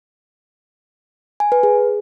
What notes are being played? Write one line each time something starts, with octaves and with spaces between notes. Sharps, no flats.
G#5
B4
G#4